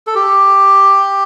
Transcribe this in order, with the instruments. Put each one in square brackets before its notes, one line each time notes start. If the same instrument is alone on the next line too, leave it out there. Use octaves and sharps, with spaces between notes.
[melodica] A4
G4